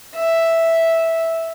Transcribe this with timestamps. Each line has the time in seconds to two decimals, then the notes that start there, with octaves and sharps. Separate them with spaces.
0.16 E5